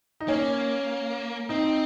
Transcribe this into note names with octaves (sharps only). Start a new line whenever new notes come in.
D#4
A#3 C#4
C4 D#4